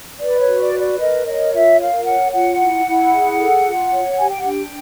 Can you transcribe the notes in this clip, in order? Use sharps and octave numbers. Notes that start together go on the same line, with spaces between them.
B4 D5
C#5
F#4
D5
B4
D5
A#4 D#5
C#5 D#5
F4 E5
A#4 F5
C#5 F#5
F4 F#5
E4
E4
G#4
A4
F4
C#5
G4 G#5
G5
F#5
D4 G5